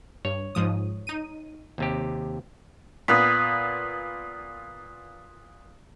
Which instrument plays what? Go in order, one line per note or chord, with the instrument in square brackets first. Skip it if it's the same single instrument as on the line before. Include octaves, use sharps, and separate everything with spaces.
[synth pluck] G2 [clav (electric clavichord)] C#5
[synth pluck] G#2 F3 D#6
D#4 D#7
[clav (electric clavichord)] D#2 C3 G4
[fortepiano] A#2 B3 [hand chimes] D#6 F#6 B6